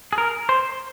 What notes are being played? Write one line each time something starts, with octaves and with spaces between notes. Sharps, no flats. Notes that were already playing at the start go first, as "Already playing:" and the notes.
G#4
A#4
C5